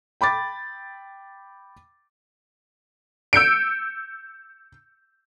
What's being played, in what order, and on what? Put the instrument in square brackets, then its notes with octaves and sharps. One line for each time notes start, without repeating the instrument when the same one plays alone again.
[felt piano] G5 B5 D6 A6
[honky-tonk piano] E6 G6 C#7 D7